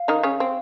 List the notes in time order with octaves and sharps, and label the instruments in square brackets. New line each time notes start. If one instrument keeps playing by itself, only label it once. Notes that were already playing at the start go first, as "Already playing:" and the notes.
Already playing: [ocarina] F5
[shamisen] D#3 D#4
C#3 C#4
C4